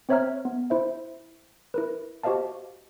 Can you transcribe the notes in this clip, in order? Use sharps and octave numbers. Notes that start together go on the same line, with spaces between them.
C4 C5 C#5 E5 A#5 F6
B3
E4 C5 E5
E4 A#4 B4
F#4 G4 C5 D#5 F5 A5